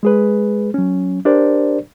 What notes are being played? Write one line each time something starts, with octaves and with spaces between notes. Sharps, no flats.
G#3 G#4 B4
F#3 C#4
D4 G4 A#4 C5 D5